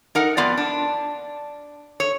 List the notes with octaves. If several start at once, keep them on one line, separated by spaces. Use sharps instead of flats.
D#4 A#4 F#5
F2 B3 F4 D5
D4
C#5